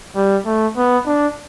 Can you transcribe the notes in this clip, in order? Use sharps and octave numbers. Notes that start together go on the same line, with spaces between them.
G3
A3
B3
D4